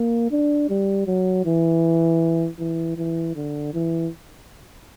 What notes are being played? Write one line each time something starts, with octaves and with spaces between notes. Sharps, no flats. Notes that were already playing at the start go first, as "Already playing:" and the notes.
Already playing: A#3
D4
G3
F#3
E3
E3
E3
D3
E3